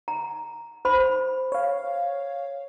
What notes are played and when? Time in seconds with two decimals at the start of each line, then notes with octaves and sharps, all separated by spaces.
0.08 A#5
0.85 C5 B5
1.52 C#5 F5